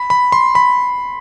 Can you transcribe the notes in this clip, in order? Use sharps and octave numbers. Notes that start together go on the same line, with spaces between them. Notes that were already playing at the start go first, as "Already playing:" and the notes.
Already playing: B5
B5
C6
B5